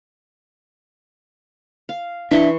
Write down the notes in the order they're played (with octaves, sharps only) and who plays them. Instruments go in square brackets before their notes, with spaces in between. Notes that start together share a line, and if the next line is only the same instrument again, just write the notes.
[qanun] F5
[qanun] E3 C6 C#6 [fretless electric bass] D4 [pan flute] E5